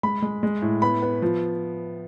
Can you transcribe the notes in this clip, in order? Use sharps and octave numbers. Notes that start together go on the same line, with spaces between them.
G#3 B5
G#3
G#3
A2
B3 B5
B3
F3